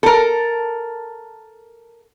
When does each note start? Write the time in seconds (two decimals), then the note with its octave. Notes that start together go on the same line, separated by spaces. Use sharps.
0.03 A4 A#4